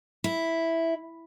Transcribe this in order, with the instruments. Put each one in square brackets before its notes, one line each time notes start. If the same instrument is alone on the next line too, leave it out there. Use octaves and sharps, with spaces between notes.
[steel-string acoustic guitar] E4